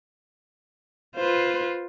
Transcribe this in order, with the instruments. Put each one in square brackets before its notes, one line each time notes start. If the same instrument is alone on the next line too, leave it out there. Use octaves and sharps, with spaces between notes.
[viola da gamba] F4 [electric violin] B4 C5